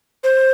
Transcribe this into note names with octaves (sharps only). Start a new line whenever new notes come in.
C5